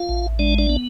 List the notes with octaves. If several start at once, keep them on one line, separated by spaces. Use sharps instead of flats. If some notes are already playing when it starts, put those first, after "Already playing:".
Already playing: F4 F5
A1
G#3 D4 D5
D4 D5
B3